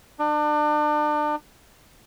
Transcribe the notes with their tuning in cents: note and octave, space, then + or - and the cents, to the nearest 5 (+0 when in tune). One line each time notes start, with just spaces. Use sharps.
D4 +35